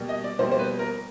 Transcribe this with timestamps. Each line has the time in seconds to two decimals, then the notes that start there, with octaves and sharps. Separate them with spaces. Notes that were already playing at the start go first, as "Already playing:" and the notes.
Already playing: B2 G3 A#3
0.09 D#5
0.24 D5
0.39 B2 G3 A#3 C5
0.52 C5
0.59 B4
0.79 A#4